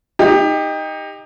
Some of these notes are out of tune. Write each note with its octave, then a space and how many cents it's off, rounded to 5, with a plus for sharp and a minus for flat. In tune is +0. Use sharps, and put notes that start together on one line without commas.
D#4 +0 G4 +25